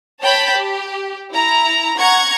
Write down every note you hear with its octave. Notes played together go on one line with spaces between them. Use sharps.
C#5 G5 A5 B5
G4
E4 A#5
F#5 A#5 C#6 G#6